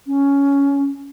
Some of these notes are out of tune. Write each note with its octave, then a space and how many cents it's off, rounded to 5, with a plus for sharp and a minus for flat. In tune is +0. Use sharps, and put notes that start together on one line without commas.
C#4 +10